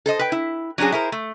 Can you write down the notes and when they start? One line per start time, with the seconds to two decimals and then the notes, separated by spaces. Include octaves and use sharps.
0.06 A4 C5 D#5
0.19 B4 G5
0.32 E4
0.78 F#3 C#4 D4 F#4 G#4
0.92 E4 G#4 A#4 C5
1.12 A3